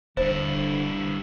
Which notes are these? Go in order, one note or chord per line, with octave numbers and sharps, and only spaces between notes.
D#1 G2 D3 E4 C5